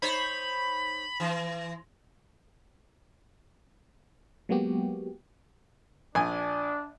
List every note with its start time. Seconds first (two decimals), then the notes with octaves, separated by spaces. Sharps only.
0.02 D#4 C5 C#5 B5
1.20 E3
4.49 F#3 G#3 A#3 B3 F#4 G4
6.15 A#1 D4 G#5